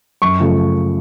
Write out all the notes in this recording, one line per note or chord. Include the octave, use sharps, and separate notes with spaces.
F#2 C#6
C#3 F3 A3